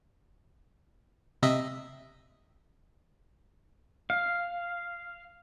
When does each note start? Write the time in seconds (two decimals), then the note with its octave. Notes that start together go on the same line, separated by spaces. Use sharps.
1.43 C3 D#5 E5
4.10 F5